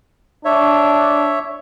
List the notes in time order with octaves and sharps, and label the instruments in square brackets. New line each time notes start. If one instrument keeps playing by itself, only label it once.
[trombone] D4 [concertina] C#5 E5